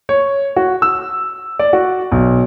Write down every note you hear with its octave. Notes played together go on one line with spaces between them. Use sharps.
C#5
F#4
E6
D5
F#4
B1